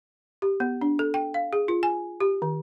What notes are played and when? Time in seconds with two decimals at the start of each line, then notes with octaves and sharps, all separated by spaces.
0.42 G4
0.60 B3
0.81 D4
0.99 A4
1.14 G5
1.34 F5
1.53 G#4
1.68 F4
1.83 G#5
2.20 G4
2.42 D#3